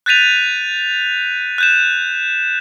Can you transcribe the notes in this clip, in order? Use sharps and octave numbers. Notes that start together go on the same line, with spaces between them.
F#6 G6 A6 B6 D#7 F7
F#6 G6 E7